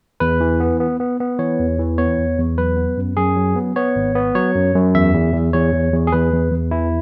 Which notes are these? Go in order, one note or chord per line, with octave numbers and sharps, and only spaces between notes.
E2 B4
E3
B3
B3
B3
B3
E3 C#5
E2
E3
B3 C#5
E2
E2
F#3 B4
B3
F#2
F#2 G#4
F#3
B3
B3 C#5
G#1
B3
F#3 C#5
F#2
F#2
E2 E5
E2
E2
E2 C#5
E2
E2
G#4
E2 B4
E2
E2
E3 E4